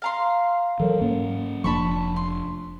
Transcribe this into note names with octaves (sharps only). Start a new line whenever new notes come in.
F5 A#5 C6 F6 C7
E3 F#3 A4 A#4 C#5
G#2 A#3 C#4
F1 F3 D4 A5 B5 C#6
C6